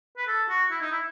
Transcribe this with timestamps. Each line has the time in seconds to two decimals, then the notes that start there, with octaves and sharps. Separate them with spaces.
0.17 B4
0.27 A4
0.49 F#4
0.70 E4
0.81 D#4
0.91 E4